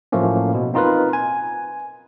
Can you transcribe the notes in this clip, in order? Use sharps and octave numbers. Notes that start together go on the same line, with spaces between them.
A2 F3 F#3 A3 A#3 C#4
B2
C4 D#4 F4 A#4 B4
G#5